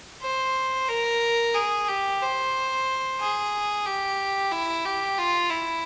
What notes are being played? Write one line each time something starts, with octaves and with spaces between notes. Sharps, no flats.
C5
A#4
G#4
G4
C5
G#4
G4
E4
G4
F4
E4